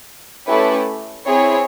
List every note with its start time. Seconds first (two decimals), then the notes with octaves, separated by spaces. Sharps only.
0.47 A3 C#4 E4 G4 B4
1.27 C4 E4 G#4 C#5